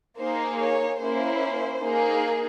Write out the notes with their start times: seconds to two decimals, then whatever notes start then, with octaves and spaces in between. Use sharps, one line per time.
0.18 A#3 D#4 G#4 C5
0.59 C#5
1.00 A#3 C#4 E4 C5
1.82 A#3 D#4 G#4